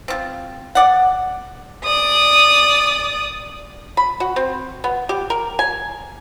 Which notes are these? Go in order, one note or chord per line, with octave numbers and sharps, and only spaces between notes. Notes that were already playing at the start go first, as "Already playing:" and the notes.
C4 F4
D5 F#5
D5 D#6
B5
F#4
C4
B3
G4
A#4
G#5